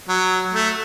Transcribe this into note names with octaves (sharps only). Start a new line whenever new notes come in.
F#3
A3